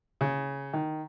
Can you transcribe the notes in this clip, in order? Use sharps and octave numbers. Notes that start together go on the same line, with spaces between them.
C#3
D#3